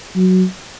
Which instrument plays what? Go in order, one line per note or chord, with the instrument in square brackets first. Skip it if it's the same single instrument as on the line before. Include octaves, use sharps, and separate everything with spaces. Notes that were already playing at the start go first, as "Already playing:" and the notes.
[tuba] F#3